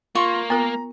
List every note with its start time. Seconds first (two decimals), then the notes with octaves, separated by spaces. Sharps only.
0.15 A#3 F4 C6 C#6
0.50 B3 F4 A#4 A#5